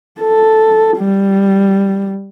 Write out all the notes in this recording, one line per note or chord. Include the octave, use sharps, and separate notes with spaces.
A4
G3